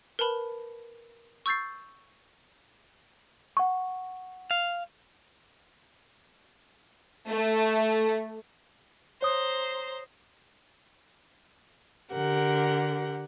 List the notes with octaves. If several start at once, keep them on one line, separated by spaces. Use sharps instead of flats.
A#4 B4 A5 B5
C#6 E6 G6 A6 C7
F#5 C#6
F5
A3
C5 C#5 A#5 D#6
D3 G4 A#4 F#5